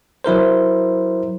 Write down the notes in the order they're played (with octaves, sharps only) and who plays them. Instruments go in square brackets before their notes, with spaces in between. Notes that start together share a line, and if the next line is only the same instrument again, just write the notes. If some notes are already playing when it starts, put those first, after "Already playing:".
[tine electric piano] F#3 E4 A#4 C5